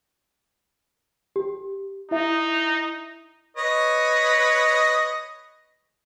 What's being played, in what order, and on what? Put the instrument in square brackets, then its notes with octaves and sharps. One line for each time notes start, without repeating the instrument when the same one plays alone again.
[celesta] G4
[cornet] D#4 [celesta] E4 E5
[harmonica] B4 C#5 D#5